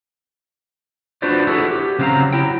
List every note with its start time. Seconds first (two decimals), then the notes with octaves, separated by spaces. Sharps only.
1.22 D4 F4 F#4 B4 C5 D5
1.47 E4 F#4 G#4 A4 B4
1.71 G4
1.99 C#3 F#3 C4 G4 F5 A#5
2.33 F#3 E4 G5